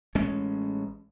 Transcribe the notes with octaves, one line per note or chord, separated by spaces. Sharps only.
A1 G#3 C#4